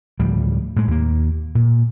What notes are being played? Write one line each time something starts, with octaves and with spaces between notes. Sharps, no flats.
D2 A2 F3 G3
A2 G#3
D#2 A#3
A#2